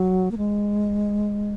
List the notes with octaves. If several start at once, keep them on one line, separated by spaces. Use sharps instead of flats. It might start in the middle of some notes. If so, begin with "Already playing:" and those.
Already playing: F#3
A#3
G#3